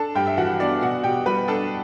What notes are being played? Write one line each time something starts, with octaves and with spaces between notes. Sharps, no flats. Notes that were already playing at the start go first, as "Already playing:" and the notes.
Already playing: D4 A4 A5
G2 G4 G5
E5
E3 F#4 F#5
B3 D4 D5
B2 F#4 F#5
B2 G4 G5
G3 B4 B5
D4 A4 A5